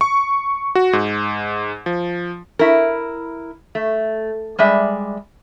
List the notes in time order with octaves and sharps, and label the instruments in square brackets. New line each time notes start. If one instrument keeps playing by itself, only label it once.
[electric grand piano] C#6
F#4
G#2
F3
[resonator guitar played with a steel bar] E4 A#4
A3
G3 G#3 D5 E5